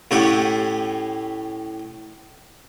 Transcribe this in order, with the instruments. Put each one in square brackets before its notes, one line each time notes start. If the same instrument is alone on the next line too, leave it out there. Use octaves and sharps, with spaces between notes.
[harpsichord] A2 A3 C#4 G4 F#5